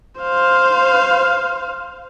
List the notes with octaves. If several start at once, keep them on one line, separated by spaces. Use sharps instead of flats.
C5 F5